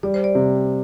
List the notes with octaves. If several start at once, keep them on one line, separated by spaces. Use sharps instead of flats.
G3 D5
C5
D5
C3